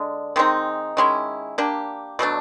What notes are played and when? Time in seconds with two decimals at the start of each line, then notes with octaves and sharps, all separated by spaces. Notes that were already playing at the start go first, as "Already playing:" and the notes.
Already playing: D3 G#3
0.36 D#3 G#3 C4 D#4
0.97 D#3 G#3 C#4 E4
1.58 A#3 D4 G4
2.19 B2 F#3 A3 D4